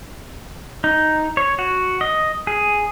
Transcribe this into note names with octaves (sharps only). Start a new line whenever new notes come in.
D#4
C#5
F#4
D#5
G#4